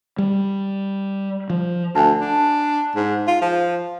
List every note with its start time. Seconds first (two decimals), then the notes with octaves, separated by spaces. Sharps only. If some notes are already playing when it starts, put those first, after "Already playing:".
0.18 G3
1.50 F3
1.95 D2 G#5 A5
2.21 D4
2.96 G#2
3.27 F4
3.41 F3